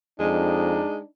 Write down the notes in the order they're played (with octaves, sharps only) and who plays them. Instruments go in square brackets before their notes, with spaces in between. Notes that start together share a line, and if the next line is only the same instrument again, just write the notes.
[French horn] F2 [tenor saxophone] G#3 [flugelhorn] D4 [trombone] D#4